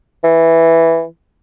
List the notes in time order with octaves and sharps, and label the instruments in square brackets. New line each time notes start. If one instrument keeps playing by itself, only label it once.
[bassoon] E3